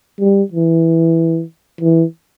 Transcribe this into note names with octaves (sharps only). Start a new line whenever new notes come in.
G3
E3
E3